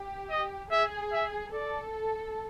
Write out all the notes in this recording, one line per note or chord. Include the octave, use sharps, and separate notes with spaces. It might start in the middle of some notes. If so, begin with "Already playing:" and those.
Already playing: G4
D#5
G#4 E5
E5
A4 D5